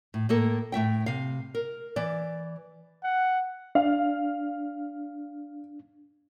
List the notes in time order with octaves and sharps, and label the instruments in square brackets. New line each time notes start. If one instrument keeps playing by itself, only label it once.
[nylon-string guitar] A2
A2 A#3 A4 A#4
A2 A3 E5 G5
C3 F5
A#4
E3 D5
[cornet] F#5
[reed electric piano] D4 [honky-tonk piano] F5